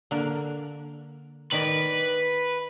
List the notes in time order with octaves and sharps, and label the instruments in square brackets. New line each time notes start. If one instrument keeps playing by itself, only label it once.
[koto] D3 A#3
[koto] D#3 D5 D#5 [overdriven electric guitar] B4